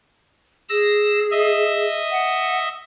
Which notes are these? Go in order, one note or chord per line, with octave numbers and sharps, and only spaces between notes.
G#4 E6 A#6
D#5 E5
F#5